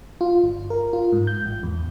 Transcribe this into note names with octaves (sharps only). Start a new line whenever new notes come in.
F4
G1
A#4
F4
G#2
G6
A1
E2